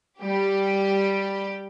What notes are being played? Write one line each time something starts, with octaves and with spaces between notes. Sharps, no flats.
G3 G4